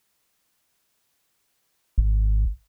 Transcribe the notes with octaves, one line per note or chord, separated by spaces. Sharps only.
G#1